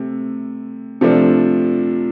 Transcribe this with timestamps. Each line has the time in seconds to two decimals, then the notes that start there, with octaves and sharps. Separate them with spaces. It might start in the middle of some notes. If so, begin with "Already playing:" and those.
Already playing: C3 A3
1.01 C3 F3 A3 D4